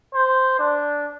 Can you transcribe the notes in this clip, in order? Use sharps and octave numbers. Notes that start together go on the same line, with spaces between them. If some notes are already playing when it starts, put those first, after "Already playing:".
C5
D4